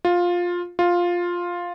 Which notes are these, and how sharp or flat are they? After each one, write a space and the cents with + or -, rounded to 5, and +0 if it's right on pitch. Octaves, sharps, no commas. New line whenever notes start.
F4 +10
F4 +5